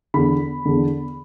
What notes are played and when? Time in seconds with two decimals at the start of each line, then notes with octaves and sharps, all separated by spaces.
0.14 E2 D3 B5
0.65 E2 D3